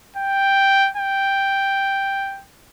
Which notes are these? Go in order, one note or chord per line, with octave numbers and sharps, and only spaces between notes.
G5
G5